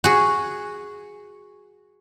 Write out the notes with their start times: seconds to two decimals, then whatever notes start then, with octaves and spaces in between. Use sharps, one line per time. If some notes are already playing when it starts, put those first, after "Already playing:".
0.04 F#4 G#4